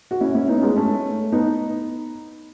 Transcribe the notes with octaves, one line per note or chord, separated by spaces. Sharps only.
F#4
C#4 E4
C#4 E4
B3 D#4
C#4
G#3 B3
A3 C#4
B3 D#4